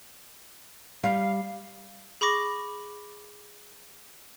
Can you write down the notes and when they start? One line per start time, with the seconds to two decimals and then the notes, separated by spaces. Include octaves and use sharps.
1.04 G3 F5
2.21 G#4 B5 C#6 D6 A#6